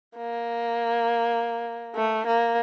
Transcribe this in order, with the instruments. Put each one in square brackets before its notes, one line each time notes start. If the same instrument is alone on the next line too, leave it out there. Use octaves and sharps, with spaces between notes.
[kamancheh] A#3
A3
A#3